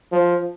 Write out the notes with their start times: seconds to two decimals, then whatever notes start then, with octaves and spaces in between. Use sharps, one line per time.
0.12 F3